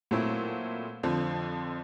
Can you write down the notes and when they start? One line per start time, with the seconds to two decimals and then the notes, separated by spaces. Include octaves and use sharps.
0.11 A#2 F#3 A3 C4 E4
1.03 F2 D3 F3